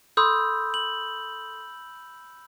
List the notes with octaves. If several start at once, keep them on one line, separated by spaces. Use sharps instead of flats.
A4 B5 C6 D#6 E6 G6
F#7